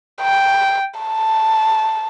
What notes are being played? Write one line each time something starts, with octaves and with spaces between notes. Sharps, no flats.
G5
A5